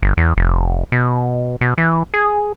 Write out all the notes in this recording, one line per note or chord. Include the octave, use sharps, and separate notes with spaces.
G1
E2
F1
B2
B2
E3
G#4